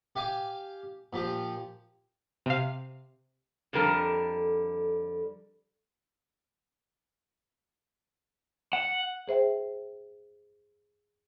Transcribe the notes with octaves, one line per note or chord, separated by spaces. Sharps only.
G4 F5 G#5 D6
A#2 F3 G4
C3 F5
F2 D3 G3 A#4 A5
F#5
G#4 C5 E5 G5